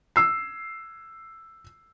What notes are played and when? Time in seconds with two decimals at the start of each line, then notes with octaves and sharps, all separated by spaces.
0.16 E6 C7